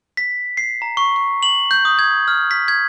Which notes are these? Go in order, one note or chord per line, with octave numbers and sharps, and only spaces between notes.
B6
C7
A#5
C#6
C#6
F#7
G6
D#6
G#6
F6
B6
G#6